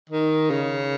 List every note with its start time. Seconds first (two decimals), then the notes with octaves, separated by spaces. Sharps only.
0.10 D#3
0.50 C#3